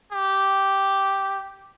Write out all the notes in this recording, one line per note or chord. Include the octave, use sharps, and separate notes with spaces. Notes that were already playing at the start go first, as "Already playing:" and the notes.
G4